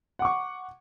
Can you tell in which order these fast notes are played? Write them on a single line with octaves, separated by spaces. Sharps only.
F#5 D6 C#6